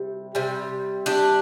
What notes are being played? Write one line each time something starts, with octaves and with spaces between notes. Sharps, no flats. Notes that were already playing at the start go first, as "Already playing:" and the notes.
Already playing: C3 G3
C3 G3
D4 G4